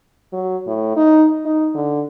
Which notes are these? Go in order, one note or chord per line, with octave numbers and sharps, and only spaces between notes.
F#3
A2
D#4
D#4
D3